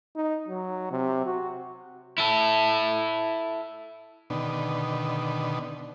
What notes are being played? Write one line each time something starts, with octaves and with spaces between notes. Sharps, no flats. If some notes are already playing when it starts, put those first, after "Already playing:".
D#4
F#3
C3
F#4
E4 A4
B2 D3 D#3